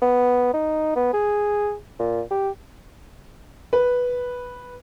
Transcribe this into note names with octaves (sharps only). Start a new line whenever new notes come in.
B3
D#4
B3
G#4
A#2
G4
B4